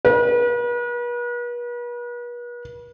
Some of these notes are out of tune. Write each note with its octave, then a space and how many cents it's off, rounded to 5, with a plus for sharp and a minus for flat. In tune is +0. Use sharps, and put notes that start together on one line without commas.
B4 -40